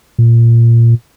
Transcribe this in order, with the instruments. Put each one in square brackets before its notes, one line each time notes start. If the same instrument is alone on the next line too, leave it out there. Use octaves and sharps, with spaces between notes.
[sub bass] A#2